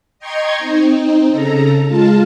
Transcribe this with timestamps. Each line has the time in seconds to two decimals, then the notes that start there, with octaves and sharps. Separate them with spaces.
0.19 D#5 G5 A#5 C6 C#6 G#6
0.59 C4 D#4
1.29 C#3 A4 A#5
1.86 G#3 F4 A5